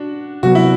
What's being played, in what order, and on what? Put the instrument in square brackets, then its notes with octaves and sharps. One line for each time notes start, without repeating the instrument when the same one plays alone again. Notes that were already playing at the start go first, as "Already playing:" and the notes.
Already playing: [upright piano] D4 F#4
[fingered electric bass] C3 F#3 B3 [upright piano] F#4
[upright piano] E4